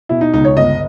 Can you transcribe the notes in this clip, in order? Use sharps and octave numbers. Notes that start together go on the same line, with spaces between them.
B2 E4
D#4
C#2 D#4
C#5
G1 D#5